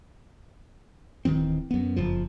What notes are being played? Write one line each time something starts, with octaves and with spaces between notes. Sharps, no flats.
D1 D#3 E3 C4
F#2 B3
F#1 F2 F3